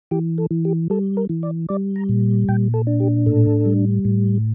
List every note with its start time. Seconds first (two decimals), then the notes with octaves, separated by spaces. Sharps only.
0.11 E3 G4
0.38 A4
0.51 E3
0.65 G4
0.90 G3 A4
1.17 A#4
1.29 E3
1.43 D5
1.69 G3 D5
1.96 A#5
2.09 A#2
2.49 A#2 G5
2.74 A4
2.87 D4
3.00 G4
3.26 A2 A4
3.65 G3
4.05 A2